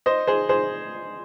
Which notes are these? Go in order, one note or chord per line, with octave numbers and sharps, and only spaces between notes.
C5 D#5
G#4 C5
G#4 C5